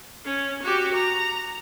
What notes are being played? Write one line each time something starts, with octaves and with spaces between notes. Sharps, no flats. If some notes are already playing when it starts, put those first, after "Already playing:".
C#4
F#4 G4
A#5